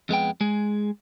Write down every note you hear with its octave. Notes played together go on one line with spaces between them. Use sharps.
F2 G#3 B3 G5
G#3 G#4